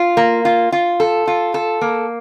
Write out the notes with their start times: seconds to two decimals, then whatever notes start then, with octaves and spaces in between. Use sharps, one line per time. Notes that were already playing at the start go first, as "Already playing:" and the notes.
Already playing: F4
0.17 A#3
0.45 F4
0.72 F4
1.00 A4
1.27 F4
1.54 A4
1.81 A#3